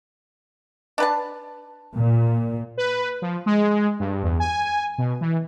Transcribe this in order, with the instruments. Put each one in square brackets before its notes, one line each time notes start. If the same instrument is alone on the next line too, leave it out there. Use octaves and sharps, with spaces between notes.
[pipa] D4 B4 A5
[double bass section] A#2
[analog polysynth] B4
F3
G#3
G2
E2
G#5
B2
E3